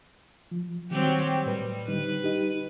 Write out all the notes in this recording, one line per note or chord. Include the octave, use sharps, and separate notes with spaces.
F3
D#3 F#3 G3 C4 G4
A2 G3 B4
D3 G3 D#4 B4
D#4 G4